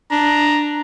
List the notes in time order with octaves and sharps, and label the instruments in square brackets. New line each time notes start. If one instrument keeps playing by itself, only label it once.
[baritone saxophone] D4 [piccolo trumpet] A#5